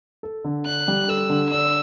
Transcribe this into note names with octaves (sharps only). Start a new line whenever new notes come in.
A4
D3
D4 F#6
G3
A4 E6
D3
D4 E6